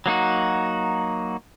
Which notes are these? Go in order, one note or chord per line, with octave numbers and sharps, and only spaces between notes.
F#3 A#3 D#4 F#4